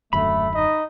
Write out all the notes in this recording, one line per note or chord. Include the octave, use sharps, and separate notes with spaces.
D#1 F#2 D3 A3 B5
D#4 D#5